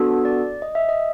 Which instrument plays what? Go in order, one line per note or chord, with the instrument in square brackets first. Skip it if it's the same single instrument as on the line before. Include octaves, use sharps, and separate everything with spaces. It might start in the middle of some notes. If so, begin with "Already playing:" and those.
Already playing: [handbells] B3 D4 F#4 A4
D5
D#5
E5
D#5